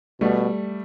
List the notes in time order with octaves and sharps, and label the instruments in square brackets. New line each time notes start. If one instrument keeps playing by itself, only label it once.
[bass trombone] B2 [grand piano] G3 A3